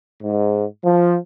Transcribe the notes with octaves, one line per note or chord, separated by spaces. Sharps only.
G#2
F3